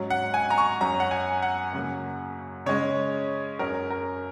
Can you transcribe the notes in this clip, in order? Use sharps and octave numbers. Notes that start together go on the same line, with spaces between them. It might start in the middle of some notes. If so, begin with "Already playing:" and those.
Already playing: G#2 F#3 C#4
F#5
G#5
A#5
C#6
F#2 F#3 C#4 A#5
F#5
G#5
F#5
F#2 C#3 F#3 A#3
C#3 G#3 C#4 C#5
F#2 F#3 C#4 A#4
A#4